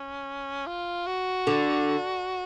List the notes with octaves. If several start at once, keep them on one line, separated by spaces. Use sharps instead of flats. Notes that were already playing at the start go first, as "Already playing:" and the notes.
Already playing: C#4
F4
F#4
D3